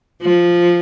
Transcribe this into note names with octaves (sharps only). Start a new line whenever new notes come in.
F3